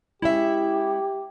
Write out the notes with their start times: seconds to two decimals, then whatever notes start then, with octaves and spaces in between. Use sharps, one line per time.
0.22 G#3 C#4 E4 G4 E5